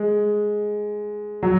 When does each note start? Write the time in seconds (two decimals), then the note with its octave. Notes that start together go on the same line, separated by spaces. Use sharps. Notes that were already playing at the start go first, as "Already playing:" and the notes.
Already playing: G#3
1.43 F#3